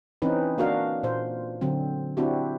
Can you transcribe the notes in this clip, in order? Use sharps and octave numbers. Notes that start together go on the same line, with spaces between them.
E3 C4 C#4 D#4 B4
A#3 D4 F#4 A#4 F5
A#2 C5
D3 F#3 C4
C4 D4 E4 F#4 G4